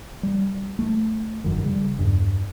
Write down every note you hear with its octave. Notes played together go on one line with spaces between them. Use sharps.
G3
A3
G1 F#2 D#3
C#3 G3
E2 G2